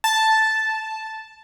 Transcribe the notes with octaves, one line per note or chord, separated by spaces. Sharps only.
A5